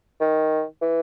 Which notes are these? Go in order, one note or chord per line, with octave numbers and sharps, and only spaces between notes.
D#3
E3